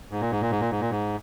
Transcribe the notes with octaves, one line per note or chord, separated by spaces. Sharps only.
G#2
A#2
G#2
A#2
G#2
A#2
G#2
A#2
G#2